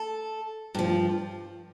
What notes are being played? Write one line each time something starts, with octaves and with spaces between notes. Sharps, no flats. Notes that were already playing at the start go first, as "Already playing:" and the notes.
Already playing: A4
G2 F3